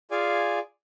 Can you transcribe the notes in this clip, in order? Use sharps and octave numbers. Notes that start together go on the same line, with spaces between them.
F4 G#4 D5 F5 G#5